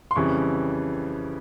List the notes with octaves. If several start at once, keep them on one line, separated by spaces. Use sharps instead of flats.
C6
F2 C#3 E3 G3 C#6